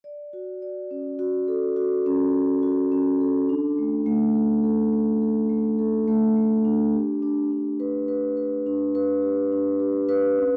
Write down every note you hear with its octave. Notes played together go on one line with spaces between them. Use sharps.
D5
F#4
D5
C#4
F#4
A4
F#4
C#4
A4
F#4
C#4
A4
D4
A3
A3
A4
A4
A3
A4
A3
A4
A3
A3
D4
G4
D4
D4
B4
B4
B4
D4
B4
G4
D4
G4
B4
C#4